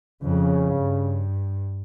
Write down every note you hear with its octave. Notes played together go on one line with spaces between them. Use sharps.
F2 C#3
G2